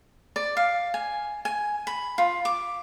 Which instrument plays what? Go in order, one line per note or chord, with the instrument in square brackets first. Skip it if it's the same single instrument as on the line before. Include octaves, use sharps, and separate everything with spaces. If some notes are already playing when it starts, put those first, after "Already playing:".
[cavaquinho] D5
F5
G#5
G#5
B5
F4
D6